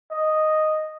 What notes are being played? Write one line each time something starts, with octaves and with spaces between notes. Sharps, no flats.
D#5